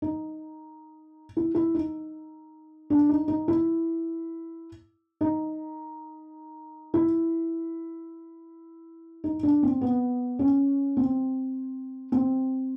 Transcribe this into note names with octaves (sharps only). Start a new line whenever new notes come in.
D#4
E4
E4
D#4
D4
D#4
D#4
E4
D#4
E4
D#4
D4
C4
B3
C#4
C4
C4